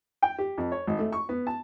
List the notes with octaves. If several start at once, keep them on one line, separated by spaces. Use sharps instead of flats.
G5
G4
F2
C#5
G#1
A3
C#6
B3
A5